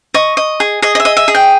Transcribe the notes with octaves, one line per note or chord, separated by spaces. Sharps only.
D#5 C#6
D#5
G#4
G#4 D#5
D#5
E5
D#5
E5
G#4
G5